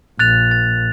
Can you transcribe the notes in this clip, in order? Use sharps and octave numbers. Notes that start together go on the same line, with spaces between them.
A#1 F#6 A6 F7
A6